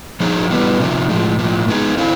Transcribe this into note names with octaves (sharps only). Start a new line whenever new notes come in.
F3 A#3 D#4 G#4 C#5
E3 G3 B3
C3 F3 A#3 D#4
A2 F3 G#3
A2 F3 A#3
G#3 B3 D#4 G#4
C4 E4 A4 C5 F5